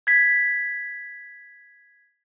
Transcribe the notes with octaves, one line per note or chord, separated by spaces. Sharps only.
G#6 B6